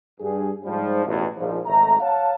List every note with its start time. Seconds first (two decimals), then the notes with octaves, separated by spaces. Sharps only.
0.20 G2 G#4
0.65 G#2 F3 G3
1.05 A1 E2 B2
1.37 A#1 G#2 F3
1.66 G#1 A3 A#5
2.00 C#5 F5 F#5 A5